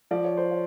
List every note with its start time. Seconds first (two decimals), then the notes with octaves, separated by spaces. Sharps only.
0.11 F3 D5
0.24 C#5
0.37 C5
0.51 C#5